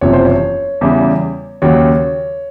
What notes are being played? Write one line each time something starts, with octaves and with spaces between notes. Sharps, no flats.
F#1 E2 C3 F3 C#5
C5
C#5
E2 C#3 E3 G3
D#2 C#3 F#3 C#5